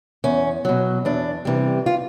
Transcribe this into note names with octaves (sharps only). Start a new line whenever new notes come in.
E2 C#4
B2 F#3
E2 D4
C3 E3 G3
F4